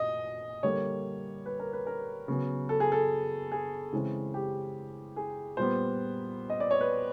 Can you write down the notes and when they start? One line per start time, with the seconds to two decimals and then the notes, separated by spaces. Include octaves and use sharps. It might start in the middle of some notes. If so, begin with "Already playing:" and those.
Already playing: A#2 D#5
0.63 D3 G3 A#3 C#5
1.46 B4
1.59 A#4
1.73 B4
1.87 A#4
2.28 C#3 F#3 B3
2.69 A4
2.80 G#4
2.92 A4
3.52 G#4
3.93 C#3 E3 G#3 C4
4.34 G4
5.16 G#4
5.57 A#2 G3 B3 C5
6.50 D#5
6.60 D5
6.71 C#5
6.81 B4